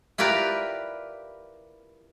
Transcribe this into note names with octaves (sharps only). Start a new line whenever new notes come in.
E4 F4 G4 A#4 B4 D5